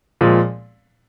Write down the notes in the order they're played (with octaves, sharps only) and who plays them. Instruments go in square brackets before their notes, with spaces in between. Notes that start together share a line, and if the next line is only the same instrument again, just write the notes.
[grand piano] A#2 F3 G#3